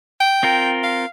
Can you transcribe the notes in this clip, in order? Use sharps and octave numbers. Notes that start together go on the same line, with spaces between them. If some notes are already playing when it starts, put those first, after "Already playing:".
G5
C4 F4 A#4
F5